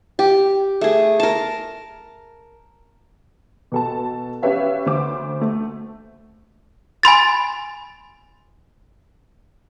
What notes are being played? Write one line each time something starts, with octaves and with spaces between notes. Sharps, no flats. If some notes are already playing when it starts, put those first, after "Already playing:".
G4
A3 G#4
A#4 A5
B2 A4 A5
C#4 G4 B4 C#5 E5 F5
D2 C5 D6
A3
G#5 B5 C6 A6